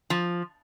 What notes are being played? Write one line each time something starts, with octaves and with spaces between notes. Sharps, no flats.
F3